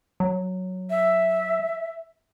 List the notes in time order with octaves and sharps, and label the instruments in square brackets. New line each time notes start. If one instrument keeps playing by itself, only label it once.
[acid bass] F#3
[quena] E5